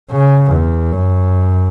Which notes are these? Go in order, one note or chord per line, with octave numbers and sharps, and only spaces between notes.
C#3
E2
F#2